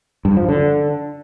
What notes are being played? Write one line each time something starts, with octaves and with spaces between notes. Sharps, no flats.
G2
F3
D3